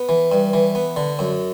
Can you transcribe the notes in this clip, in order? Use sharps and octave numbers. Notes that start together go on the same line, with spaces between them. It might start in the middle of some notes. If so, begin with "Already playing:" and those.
Already playing: B3
E3
G2
E3
B3
D3
F#2